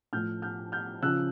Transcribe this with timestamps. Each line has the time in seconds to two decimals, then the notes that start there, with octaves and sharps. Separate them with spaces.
0.13 A2 F3 F6 G6
0.42 F6 G6
0.72 F6 G6
1.02 C#3 F3 E6 F#6